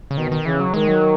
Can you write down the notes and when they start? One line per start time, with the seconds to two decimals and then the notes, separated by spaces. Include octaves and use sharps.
0.11 C#3
0.17 B2 D#3
0.32 D#3
0.45 C#3 E3
0.60 F#3
0.74 D#3 G#3
0.88 F#3